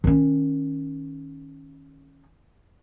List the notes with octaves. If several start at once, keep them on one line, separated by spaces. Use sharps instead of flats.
D#3 C#4